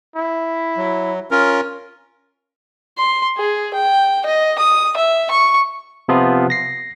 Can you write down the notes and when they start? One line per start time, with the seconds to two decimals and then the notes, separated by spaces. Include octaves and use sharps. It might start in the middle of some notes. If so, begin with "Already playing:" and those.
0.16 E4
0.77 F#3
1.31 C#4 F4 A#4
2.98 C6
3.37 G#4
3.74 G5
4.25 D#5
4.59 D#6
4.97 E5
5.31 C#6
6.08 C3 F3 B3 F4
6.50 A#6 C7